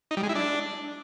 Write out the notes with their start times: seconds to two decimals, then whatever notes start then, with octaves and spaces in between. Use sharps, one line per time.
0.11 D#4
0.17 G3
0.23 G#3
0.29 E4
0.35 D4